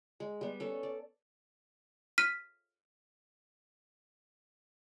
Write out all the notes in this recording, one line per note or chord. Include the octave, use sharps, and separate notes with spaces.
G#3
G3 B3
C#4 A4
D5
F6 B6 D#7